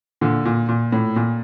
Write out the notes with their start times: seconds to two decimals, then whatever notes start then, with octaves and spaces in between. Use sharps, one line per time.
0.21 A#2 D3
0.45 A#2
0.69 A#2
0.93 A2
1.16 A#2